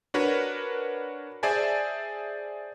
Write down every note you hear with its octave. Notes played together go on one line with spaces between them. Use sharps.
D4 F#4 A#4 B4 C#5
G#4 C5 D5 E5 G#5 A5